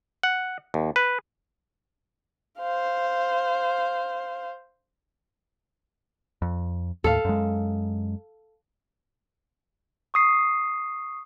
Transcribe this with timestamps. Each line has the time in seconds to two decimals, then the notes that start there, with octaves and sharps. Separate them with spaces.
0.23 F#5
0.74 D#2
0.96 B4
2.59 C5 F5
6.42 F2
7.04 D#2 A2 A4 F5
7.25 F#2 G#3
10.14 C#6 D#6 C7